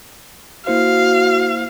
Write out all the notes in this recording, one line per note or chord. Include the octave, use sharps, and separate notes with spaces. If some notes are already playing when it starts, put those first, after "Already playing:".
A#3 E4 F#4 C5 F5